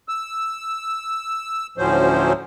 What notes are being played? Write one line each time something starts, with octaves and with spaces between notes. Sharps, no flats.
E6
D2 A2 F3 F#3 C#4 C5